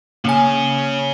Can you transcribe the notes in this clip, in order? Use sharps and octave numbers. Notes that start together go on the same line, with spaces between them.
C#3 A#3 C#4 G#5